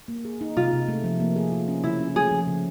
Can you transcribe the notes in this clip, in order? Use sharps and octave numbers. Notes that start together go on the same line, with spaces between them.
A#3
G#4
D#4
C3 F4
C3
A3
F3
A#3
G#4
F4
C#4
C#3 E4
C#4
A3 G#4
F3
C#3